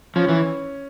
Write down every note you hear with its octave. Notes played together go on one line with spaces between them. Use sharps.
F3 C#4
E3